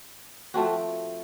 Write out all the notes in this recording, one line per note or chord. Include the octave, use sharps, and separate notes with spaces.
F3 A3 C4 F#4